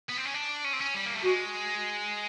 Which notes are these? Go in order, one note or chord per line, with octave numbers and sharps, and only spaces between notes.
B3
C4
C#4
D4
C#4
C4
C#4
G3
A#3
A3
G#3 F#4